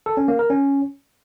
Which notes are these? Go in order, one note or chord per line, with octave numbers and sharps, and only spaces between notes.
A4
C#4
A#3
A#4
C#4